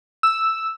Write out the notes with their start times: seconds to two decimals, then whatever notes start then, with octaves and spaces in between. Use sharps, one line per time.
0.23 E6